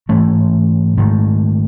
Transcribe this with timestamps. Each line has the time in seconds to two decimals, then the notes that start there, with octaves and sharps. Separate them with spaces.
0.09 G#2 E3 A3 C#4
0.97 G#2 D#3 A3